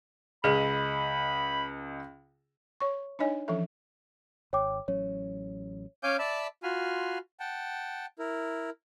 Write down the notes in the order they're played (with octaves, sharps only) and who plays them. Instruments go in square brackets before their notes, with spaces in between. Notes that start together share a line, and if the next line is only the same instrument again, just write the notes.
[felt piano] C#2 D#5 [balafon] G#4 [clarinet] B5
[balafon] C#5 C#6
D4 D#4 C#5 D#5 G#5
E3 F3 C#4 A4 E5
[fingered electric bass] G#1 [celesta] C#5 G5 D6
[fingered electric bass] A1 F#3 C#4 [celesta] C#5
[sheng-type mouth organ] C#4 C#5 F5 G#5 D6 G6
D5 E5 A5 B5 E6
F4 F#4 G#5 B5 C6 F6
F#5 G5 A5
E4 A#4